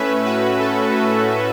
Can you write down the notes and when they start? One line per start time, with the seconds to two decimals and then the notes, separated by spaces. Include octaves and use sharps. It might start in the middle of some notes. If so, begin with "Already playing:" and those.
Already playing: A2 A3 C#4 B4 E5
0.25 F#4 B4
0.59 A4
0.92 F#4